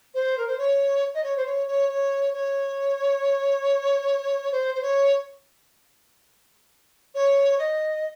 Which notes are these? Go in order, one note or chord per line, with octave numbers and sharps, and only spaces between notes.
C5
A#4
C5
C#5
D#5
C#5
C5
C#5
C#5
C#5
C#5
C5
C5
C#5
C#5
D#5